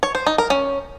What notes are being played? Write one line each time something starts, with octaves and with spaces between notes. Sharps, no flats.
C#5
C5
D#4
A#4
C#4